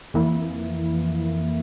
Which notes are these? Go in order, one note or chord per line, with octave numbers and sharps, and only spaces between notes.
F2 E3 A#3 E4